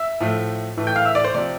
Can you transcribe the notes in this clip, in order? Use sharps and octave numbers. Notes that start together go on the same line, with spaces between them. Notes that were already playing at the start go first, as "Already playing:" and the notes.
Already playing: E5 E6
A2 F3 A3
A2 E3 A3
G5 G6
F5 F6
E5 E6
D5 D6
C5 C6
C3 F3 D5